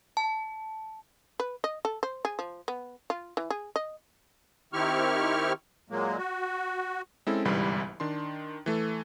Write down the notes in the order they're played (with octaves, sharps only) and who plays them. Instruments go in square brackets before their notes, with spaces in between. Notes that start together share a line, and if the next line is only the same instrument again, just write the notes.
[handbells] A5
[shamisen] B4
D#5
A4
C5
G#4
F3
B3
F4
E3
G#4
D#5
[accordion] D#3 C4 E4 G4 C#6 F6
A#2 F#3 G#3 A#3
F#4
[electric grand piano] G#3 C4 C#4 E4 A4
G1 C2 G#2 E3 G3 B5
D#3 D4 C6
E3 A3 A4